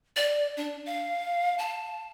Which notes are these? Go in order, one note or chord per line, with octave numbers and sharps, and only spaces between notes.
D5
D4
F5
A5